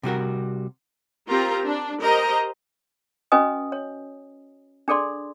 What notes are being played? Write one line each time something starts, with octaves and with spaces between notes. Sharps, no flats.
C3 G3 F#4 A#4
C4 F4 G4 A#4 A#5
D4
G4 A#4 C5 D#5 A#5
C#4 F#4 B4 D#5 G#5 D#6
C#5
D4 G#4 A4 D5 C6